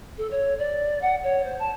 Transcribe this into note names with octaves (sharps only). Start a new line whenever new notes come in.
A4
C#5
D5
F#5
C#5
C5
A5